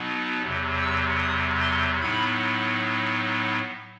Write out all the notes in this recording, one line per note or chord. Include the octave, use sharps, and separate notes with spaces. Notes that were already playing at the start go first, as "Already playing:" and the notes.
Already playing: B2 F#3 B3 D#4
E2 C3 F#3
E6
D#6
C6
A2 F#3 B3 D#4 B5